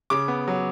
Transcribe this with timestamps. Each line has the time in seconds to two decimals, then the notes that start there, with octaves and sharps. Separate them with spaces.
0.10 C#3 D6
0.28 B3
0.48 F#3